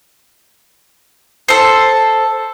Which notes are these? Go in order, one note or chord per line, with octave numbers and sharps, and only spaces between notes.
A4 C5